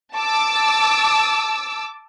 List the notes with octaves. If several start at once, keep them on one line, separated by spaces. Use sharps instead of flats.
A5 D6 E6